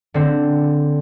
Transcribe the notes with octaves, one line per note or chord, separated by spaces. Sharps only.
D3 C4